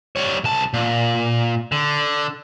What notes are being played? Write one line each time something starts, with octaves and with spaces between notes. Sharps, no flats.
G3 C#5
C2 A5
A#2
D3